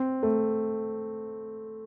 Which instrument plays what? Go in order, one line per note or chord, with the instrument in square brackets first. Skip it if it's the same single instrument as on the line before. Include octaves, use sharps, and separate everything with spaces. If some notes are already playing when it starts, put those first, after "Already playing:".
Already playing: [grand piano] C4
A3